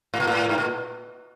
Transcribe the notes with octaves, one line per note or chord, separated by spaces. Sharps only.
A2
A#2
A2
G#2
A#2